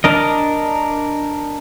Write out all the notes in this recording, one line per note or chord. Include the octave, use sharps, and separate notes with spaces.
D4 A#4 D#5